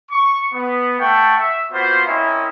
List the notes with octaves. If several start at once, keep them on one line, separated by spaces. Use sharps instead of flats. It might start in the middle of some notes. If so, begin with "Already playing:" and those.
C#6
B3
A3 F#5 G5 A5 C#6
E5
A#3 B3 F4 F#4 C5
C4 C#4 E4 A#4 D#5 E5